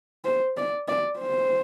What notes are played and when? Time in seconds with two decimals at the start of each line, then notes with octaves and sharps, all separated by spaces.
0.25 C5
0.57 D5
0.88 D5
1.19 C5